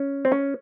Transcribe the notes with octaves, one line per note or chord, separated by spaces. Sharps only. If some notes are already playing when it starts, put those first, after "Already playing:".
Already playing: C#4
C4
C#4